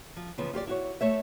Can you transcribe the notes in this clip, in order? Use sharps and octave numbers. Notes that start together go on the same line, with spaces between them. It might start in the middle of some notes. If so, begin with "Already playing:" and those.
F3
C#3 E3 F3 B3
F4 G4 C#5 D5
E4 F#4 C#5
A3 C#5 E5